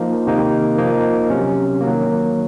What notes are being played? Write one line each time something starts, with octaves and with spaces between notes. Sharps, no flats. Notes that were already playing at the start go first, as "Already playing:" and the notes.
Already playing: F3 A#3 D#4
C3 D#3 A#3 D#4
F3 A#3 D#4
C3 F#3 C#4
D#3 F#3 A#3